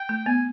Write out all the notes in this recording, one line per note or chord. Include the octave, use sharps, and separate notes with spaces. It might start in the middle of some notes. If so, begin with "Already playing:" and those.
Already playing: G5
A3
B3 G#5